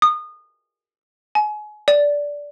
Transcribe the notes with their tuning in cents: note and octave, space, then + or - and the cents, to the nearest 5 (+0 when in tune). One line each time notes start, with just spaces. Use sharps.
D#6 -25
G#5 +30
D5 -10